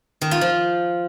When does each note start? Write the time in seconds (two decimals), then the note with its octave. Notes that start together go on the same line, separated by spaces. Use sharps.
0.21 D#3
0.31 F4
0.41 F3